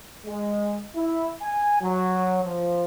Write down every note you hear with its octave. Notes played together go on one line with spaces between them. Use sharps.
G#3
E4
G#5
F#3
F3